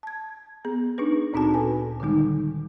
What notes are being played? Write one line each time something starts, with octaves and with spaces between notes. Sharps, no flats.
A5 G#6
B3 G#4
D4 D#4 G#4 B4
D2 A#2 C4 D#4 F#4 A5
A4 B4 G#5
D3 D#3 G3 G#3 D#4